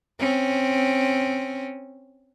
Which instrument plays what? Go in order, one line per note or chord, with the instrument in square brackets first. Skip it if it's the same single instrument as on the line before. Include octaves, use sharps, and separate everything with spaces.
[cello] C4 C#4